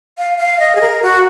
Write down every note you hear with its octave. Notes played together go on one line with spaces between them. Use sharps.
F5
F5
D#5
G#4
A#4
F#4